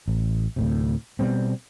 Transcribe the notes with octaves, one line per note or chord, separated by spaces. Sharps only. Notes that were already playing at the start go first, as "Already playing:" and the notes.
A1
D2 A2 C3
B2 G3 B3 C4